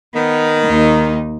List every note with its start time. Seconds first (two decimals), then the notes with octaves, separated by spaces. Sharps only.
0.14 D#3 B3
0.67 D#2 D#4